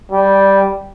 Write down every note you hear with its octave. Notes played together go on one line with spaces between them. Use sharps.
G3